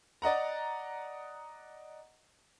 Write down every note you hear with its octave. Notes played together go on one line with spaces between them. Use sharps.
D5 D#5 F#5 A#5